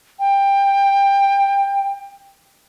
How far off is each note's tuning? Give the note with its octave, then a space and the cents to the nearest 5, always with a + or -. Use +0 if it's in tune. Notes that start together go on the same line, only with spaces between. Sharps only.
G5 +20